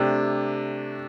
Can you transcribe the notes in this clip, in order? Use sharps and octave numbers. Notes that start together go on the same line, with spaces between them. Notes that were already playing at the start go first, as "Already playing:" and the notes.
Already playing: C3 A3 D4 G4